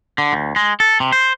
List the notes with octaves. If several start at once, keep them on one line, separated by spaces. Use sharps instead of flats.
D3
D2
G#3
A4
C3
C5